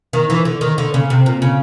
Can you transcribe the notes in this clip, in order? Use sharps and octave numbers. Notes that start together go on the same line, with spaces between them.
D#3
E3
D3
D#3
D3
C#3
C3
A#2
C#3